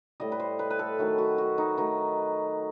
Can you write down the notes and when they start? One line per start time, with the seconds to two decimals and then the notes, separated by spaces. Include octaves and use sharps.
0.20 A2 G3 D#5
0.32 B4
0.40 C5
0.59 B4
0.70 B4
0.79 A4
0.99 D#3 F#3 A3
1.18 F#4
1.38 F#4
1.58 D#4
1.77 D#3 F#3 A3 D#4